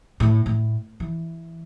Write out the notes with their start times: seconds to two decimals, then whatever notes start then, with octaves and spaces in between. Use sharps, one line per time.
0.20 A2
0.46 A2
1.00 E3